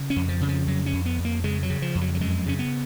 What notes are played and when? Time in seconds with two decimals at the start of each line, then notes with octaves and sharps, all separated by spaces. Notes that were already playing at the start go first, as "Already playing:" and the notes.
Already playing: C#3
0.10 C#4
0.16 F2
0.29 F3
0.41 C#3
0.48 F3
0.67 F2 F#3
0.86 C#4
0.93 F2
1.06 B3
1.18 F2
1.25 A#3
1.44 C#3 G#3
1.63 F#3
1.70 C#3
1.82 F3
1.95 F2
2.01 F#3
2.15 F#3
2.21 F#2 G#3
2.46 C#3 C#4
2.59 B3